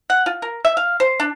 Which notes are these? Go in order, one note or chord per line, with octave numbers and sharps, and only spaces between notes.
F#5
F4
A#4
E5
F5
C5
D4